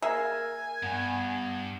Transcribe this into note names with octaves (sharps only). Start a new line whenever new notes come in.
A#3 G#4 A#4 E5 G#5
G2 B3